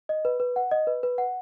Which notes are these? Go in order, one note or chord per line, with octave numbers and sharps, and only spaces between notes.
D#5
B4
B4
F#5
D#5
B4
B4
F#5